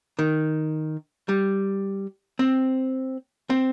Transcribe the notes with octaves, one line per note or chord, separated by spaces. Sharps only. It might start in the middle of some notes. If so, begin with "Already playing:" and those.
D#3
G3
C4
C4